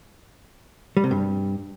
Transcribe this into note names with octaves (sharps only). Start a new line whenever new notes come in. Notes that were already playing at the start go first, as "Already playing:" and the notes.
G3
C3
G2